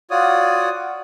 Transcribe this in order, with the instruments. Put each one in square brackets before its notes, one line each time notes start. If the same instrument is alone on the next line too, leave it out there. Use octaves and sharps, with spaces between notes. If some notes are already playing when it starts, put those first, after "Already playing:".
[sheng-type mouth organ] F4 F#4 C#5 D5 D#6